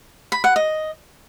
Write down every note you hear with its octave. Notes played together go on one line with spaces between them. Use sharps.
B5
F#5
D#5